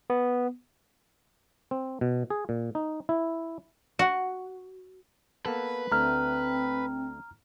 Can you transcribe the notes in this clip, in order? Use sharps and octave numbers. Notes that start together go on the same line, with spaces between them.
B3
C4
B2
G#4
A#2
D#4
E4
F#4
A#3 B3 A4 B4
D2 A3 C4 A#5 F6